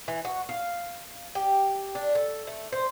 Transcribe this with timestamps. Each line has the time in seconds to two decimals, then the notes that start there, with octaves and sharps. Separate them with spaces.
0.08 E3
0.25 F#4
0.49 F5
1.35 G4
1.95 D4
2.15 A4
2.47 A3
2.72 C5